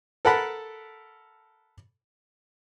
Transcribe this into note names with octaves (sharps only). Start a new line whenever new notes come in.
A4 A#4 F#5 A5 B5